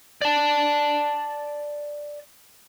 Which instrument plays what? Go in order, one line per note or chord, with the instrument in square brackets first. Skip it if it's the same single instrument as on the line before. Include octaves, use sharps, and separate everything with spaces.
[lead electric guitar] D5 A5